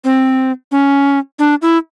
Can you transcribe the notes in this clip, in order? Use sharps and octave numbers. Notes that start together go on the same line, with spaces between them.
C4
C#4
D4
E4